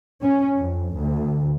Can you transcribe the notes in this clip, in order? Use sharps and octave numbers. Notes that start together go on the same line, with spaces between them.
C#4
F2
D2